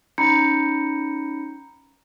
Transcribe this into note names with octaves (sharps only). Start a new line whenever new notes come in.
C#4 D#4 A#5 B5 G6 C#7